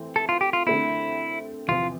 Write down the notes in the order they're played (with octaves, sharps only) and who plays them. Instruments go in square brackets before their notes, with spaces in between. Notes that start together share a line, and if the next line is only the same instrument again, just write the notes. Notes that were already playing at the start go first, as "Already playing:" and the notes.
Already playing: [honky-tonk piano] E3 A3 C4
[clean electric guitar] A4
F4
G4
F4
[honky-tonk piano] D3 A3 C4 [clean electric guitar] E4
[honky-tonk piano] E2 C3 F3 [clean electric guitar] F4